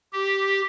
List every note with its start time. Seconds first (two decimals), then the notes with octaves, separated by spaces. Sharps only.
0.13 G4